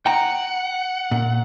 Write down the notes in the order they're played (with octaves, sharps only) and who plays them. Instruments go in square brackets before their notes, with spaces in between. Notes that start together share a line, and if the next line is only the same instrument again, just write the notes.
[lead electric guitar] F#5 [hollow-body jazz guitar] G5 A#5
[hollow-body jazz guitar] A#2